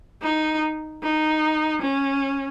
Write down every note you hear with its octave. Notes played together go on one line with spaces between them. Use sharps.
D#4
D#4
C#4